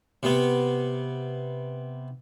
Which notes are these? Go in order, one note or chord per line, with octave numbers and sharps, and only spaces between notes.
C3 B3